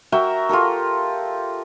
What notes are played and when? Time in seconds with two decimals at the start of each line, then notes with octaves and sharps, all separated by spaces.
0.12 F#4 A#4 E5 G5
0.49 F4 G4 A4 A#4